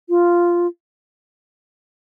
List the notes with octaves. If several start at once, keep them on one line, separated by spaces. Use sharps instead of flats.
F4